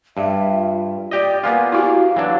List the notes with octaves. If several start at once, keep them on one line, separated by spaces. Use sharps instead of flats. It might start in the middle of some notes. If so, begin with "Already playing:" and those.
G2 E5
F4
G4 D5 D#5
A#3 B3 F4 G#5
E4 F#4 G4 F5
E3 F#3 D4